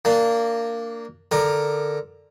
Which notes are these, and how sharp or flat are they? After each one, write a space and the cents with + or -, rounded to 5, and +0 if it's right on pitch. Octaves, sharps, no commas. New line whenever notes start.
A#3 -15 D4 +0
D3 +0 A#4 +0 D6 +35